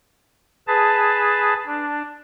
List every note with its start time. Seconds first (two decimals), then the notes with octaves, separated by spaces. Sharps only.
0.67 G#4 B4 A5
1.66 D4